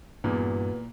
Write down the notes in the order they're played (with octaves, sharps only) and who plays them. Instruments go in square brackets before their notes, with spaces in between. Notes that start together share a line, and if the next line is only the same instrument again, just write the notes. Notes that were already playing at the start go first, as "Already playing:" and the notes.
[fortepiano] E2 [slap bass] G2 [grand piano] A#2 [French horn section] F#4 B4